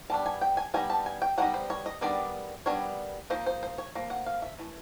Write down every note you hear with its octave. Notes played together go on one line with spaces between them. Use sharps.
G3 B3 D4 A5
G#5
G5
G#5
G3 B3 D#4 G#5
A5
G#5
G5
G3 B3 D#4 F#5
C5
C#5
D#5
D#3 G3 B3 D4 D5
D#3 G3 B3 D4 C#5
F3 A#3 D#4 C5
C5
C5
C#5
F3 A#3
F#5
F5
E5
E3 A3